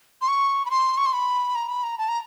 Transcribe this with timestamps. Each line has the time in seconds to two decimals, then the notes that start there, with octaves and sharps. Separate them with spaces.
0.21 C6
0.28 C#6
0.65 B5
0.70 C6
0.98 C#6
1.06 C6
1.13 B5
1.55 A#5
1.69 B5
1.83 A#5
1.98 A5
2.08 A#5